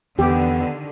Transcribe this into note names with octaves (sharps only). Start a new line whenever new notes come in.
E2 D3 D#3 B3 G4